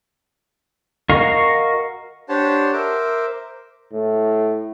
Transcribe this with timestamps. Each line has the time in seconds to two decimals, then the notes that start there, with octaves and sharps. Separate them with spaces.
1.09 F#4 A#4 D#5 F5 C#6
2.29 D4 G4 C5 C#5 F#5 A5
2.73 A#4 C5 E5 D6
3.92 A2